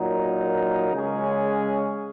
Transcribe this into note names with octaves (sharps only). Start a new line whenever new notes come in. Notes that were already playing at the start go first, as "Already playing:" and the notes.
Already playing: A#2 F#3 D#4 A#4
C#3 G#3 C#4 G#4